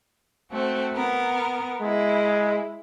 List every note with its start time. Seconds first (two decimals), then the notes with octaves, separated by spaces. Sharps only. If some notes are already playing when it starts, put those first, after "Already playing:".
0.51 A3 C4 F#4
0.93 B3 A#4
1.81 G#3 E4